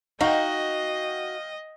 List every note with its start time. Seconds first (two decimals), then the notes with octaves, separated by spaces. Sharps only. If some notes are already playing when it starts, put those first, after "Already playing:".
0.21 D#4 F#4 D#5 F5 G5